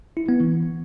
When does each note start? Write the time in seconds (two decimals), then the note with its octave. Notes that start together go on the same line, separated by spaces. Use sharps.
0.17 E4
0.29 B3
0.40 E3